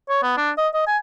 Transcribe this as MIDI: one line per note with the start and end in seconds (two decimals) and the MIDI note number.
0.10 0.21 73
0.23 0.36 59
0.37 0.51 62
0.58 0.68 75
0.74 0.86 75
0.87 0.97 80